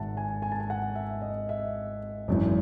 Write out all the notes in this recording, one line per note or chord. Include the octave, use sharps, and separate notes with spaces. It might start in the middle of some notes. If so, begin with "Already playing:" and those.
Already playing: G#1 G#2 D#3 E5 F#5 A5
G#5
G#5
A5
G#5
F#5
E5
D#5
E5
G#1 F#2 E3